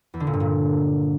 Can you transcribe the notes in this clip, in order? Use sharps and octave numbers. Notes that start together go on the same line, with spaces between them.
E2
D3
A#2
G2
A#2